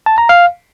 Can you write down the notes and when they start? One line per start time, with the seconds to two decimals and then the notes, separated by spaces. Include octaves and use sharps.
0.06 A5
0.18 A#5
0.29 F5